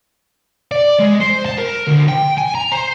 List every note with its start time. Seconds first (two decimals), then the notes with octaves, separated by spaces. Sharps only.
0.72 D5
0.99 G#3
1.21 C5
1.46 A5
1.58 A#4
1.87 D2
2.08 G5
2.38 G#5
2.55 A#5
2.72 C5